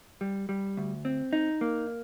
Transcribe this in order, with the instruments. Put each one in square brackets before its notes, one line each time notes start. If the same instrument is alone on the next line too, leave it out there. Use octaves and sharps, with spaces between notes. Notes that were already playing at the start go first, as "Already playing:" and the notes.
[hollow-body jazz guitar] G3
G3
D2
C4
D#4
A#3